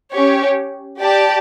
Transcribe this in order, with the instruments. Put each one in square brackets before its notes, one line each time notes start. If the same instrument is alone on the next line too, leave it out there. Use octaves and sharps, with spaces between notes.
[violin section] C#4 G4 C#5
G4 D5 A5